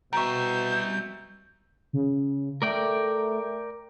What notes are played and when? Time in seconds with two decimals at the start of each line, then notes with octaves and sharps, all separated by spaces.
0.13 B2 G3 E5 A#5 C#6 G6
1.93 C#3
2.62 A3 A#4 D5 G5